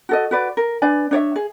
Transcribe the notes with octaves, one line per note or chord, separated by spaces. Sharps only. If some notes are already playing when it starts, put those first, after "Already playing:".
F#4 A4 D#5
F#4 B4 D5
A#4
D4 B4 D5 G#5
D4 C#5 D5 E5
G#4